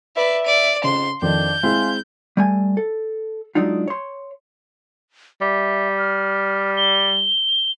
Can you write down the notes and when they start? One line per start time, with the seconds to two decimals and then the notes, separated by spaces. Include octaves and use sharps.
0.17 B4 D5 E5
0.46 D5 D#7
0.84 F2 G#2 C#3 C6
1.22 F2 D#3 F3 D4 G6
1.63 G#3 C4 E4 F5 G#5 C6
2.37 G3 A3 G#5
2.77 A4
3.55 F#3 G#3 D4 D#4 F4
3.88 C#5 C6
5.41 G3 E5
5.98 F6
6.77 G7